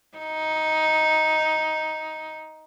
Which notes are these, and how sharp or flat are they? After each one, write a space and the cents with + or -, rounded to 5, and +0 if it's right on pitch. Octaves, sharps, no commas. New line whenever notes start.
D#4 +10